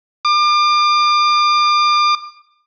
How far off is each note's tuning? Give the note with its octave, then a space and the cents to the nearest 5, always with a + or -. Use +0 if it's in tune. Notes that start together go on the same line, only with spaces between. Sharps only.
D6 +35